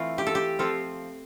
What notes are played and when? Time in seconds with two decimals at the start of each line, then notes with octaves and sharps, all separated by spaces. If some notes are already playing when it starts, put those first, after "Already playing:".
Already playing: E3 A3 C4 F4
0.18 G4
0.27 A4
0.35 G4
0.59 F3 C4 F4 A4